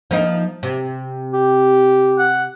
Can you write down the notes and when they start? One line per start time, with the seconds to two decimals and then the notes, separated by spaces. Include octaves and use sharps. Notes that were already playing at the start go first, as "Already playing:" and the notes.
0.11 F3 A#3 D#4
0.63 C3
1.33 G4
2.18 F#5